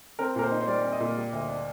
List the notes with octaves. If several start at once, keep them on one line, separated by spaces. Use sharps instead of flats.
C4 A#4
A#2 A#4
C5
D#4
C5
G3 D5
C4
D#5
A#2
G3
D2
D4